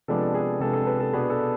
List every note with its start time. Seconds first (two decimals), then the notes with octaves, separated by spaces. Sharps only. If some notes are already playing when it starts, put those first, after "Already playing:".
0.08 C3 F3 G#3 B3 D4 A4
0.34 G#4
0.60 C3 F3 G#3 B3 D4 A4
0.73 A4
0.87 B4
1.00 A4
1.13 B2 B3 D4 G#4
1.30 A4